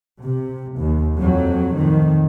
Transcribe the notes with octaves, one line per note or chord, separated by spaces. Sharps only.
C3
D#2
F2 F#3
F2 A2 D#3